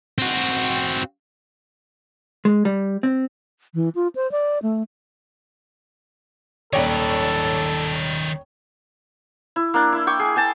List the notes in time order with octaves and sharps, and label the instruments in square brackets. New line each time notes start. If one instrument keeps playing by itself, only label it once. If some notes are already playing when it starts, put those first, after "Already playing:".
[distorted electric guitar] C4 F#4
[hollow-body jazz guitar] G#3
G3
C4
[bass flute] E3
F4
C5
D5
A3
[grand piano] D#1 D5 [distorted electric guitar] D#3 B4 [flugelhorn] A4 [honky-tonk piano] C#5 G5
[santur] E4
A#3 D4
E4
G5 C#6 D6
G#4
G#4 G5 A5